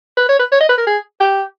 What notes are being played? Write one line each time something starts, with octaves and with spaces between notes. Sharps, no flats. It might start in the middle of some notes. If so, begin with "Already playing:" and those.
B4
C#5
B4
C#5
D#5
B4
A#4
G#4
G4